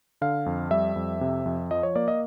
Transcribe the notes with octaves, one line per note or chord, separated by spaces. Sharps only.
D3 F5
F2
G3 E5
F2
C3
F2
F3 D#5
C#5
A#3 D5
D#5